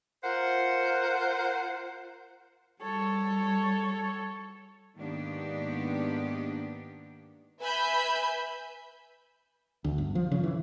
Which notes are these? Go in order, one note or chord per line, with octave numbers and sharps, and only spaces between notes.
F4 A#4 C5 F#5
G3 A4 C#5
G#2 D#3 A#3 B3 D4 G4
B4 E5 G#5 B5 G6
D2
G1
F3
C#3
E3